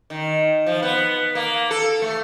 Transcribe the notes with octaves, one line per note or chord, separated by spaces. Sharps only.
D#3
F3
B3
A#3
A4
A3